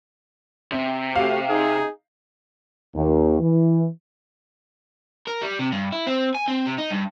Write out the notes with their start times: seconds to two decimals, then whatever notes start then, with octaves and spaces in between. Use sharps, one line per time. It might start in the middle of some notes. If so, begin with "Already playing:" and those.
0.72 C3 C4
1.16 A3 F#4 G4 F5
1.50 D#4 G#4
2.95 D#2
3.40 E3
5.27 A#4
5.42 G3
5.59 C3
5.72 G2
5.92 E4
6.07 C4
6.35 G#5
6.48 C4
6.66 C3
6.78 D#4
6.91 G2